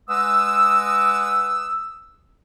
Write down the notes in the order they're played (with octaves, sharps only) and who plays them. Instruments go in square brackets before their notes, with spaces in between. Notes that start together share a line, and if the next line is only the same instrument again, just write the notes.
[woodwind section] G#3 B4 F#5 D#6 E6